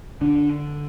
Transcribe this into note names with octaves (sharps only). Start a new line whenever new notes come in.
D3 D4